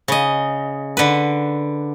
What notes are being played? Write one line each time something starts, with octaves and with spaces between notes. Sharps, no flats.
C#3 D#5
D3 B4